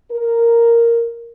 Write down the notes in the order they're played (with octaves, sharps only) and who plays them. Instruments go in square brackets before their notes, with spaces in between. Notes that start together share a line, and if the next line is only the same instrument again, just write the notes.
[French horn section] A#4